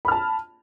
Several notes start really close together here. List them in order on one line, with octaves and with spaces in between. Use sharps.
B5 F6 A5